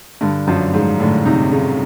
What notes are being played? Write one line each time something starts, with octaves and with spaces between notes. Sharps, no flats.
G2 D3
F#2 F3
G#2 F3
A2 D3
C3 D#4
C#3 D#4